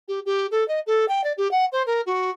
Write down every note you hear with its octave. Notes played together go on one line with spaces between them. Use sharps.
G4
G4
A4
D#5
A4
G5
D5
G4
F#5
C5
A#4
F#4